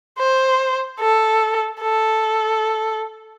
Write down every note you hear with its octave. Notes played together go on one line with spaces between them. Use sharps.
C5
A4
A4